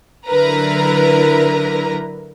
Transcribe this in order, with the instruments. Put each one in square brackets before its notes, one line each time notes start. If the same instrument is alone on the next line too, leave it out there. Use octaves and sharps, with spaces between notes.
[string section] D3 F#3 E4 A#4 B4 A#5